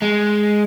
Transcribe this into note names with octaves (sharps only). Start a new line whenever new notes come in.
G#3